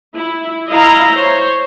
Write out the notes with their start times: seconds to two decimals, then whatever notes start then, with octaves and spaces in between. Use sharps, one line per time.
0.17 E4
0.70 E4 D#5 F5 A#5
1.12 C5 C#5